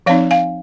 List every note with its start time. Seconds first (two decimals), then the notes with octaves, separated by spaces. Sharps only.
0.06 F3 C4 D#4 C#5 F5
0.31 F5 G#5